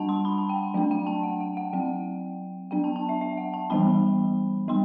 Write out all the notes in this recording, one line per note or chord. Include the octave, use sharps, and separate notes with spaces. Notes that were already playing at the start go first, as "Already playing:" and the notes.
Already playing: G3 D4 F#5 A5
C6
B5
A5
G5
F#3 A3 D4 G5
G5
A5
F#5
F#5
F#5
F#3 C4 G5
F#3 B3 D4 G5
A5
A5
E5
E5
F#5
A5
E3 G3 B3 B5
G3 B3 C6